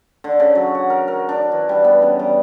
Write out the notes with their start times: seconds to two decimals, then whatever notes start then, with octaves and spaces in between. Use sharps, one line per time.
0.24 D3
0.40 C#3
0.55 F#3
0.75 F#5
0.90 A#4
1.08 A#4
1.29 D4
1.52 E3
1.69 G3
1.84 B3
2.02 C#3
2.19 G3